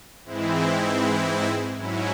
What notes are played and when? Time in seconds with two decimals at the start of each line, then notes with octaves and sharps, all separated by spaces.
0.24 G#2 E3 G#3 C4 E4
1.77 G#2 F#3 C#4 E4